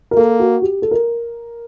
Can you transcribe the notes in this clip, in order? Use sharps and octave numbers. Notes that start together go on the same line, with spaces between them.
A#4
A#3 A4
F#4
G4
A4
A#4